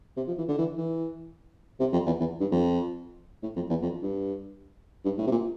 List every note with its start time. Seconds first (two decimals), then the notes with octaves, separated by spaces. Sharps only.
0.17 C3
0.27 F3
0.38 E3
0.48 D3
0.58 E3
0.78 E3
1.80 C3
1.93 F2
2.06 E2
2.20 E2
2.40 G2
2.51 F2
3.43 A2
3.56 F2
3.69 E2
3.82 F2
4.03 G2
5.05 G2
5.18 A2
5.27 C3
5.31 A#2